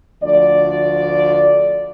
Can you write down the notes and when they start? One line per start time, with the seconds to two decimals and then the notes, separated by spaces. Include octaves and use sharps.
0.23 D2 F3 D5